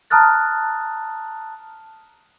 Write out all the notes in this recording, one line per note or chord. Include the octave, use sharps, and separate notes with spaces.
A5 A#5 D#6 F6 F#6 A6